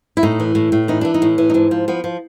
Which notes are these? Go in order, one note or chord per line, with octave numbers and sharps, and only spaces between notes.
E4
A2 D#4
E3
A2
A2
E3 D#4
E3 D4
D#4
A2
E3
D#4
G#2 D4
F3
F3 B3
F3